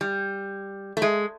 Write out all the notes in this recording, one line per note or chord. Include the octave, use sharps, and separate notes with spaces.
G3
A3
G#3